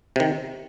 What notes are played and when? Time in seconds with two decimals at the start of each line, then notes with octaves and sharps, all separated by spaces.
0.16 C3 D#3